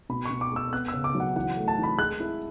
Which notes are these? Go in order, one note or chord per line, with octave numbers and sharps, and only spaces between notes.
B2 B5
C#6
B2
D6
G#3 E6
B3 F#6
C#3 E6
D6
F#3
F#5
E3 F#5
A3
A5
E3
B5
G#3 F#6
E4